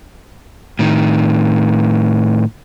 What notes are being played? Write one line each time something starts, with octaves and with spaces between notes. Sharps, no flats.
A2 D#3